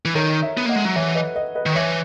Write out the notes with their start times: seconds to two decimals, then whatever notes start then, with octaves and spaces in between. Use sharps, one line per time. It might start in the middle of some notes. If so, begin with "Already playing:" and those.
0.05 E3
0.15 D#3 A#4 C#5
0.42 C#5 E5
0.57 B3
0.66 A#3 D#5 F#5
0.76 G#3
0.85 F#3
0.96 E3 C#5 E5
1.15 B4 D#5
1.35 B4 D#5
1.55 B4 D#5
1.66 D#3
1.75 E3 C#5 E5